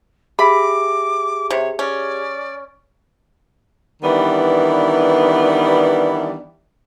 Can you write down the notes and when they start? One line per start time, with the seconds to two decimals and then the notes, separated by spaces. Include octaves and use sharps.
0.39 G4 G#4 E5 B5 D6
1.50 C3 C#5
1.79 C#4 D5
4.03 D#3 E3 G3 B3 D4